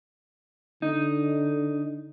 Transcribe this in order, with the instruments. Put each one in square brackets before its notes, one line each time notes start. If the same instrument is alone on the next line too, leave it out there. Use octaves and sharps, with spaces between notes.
[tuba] D3 [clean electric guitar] D#4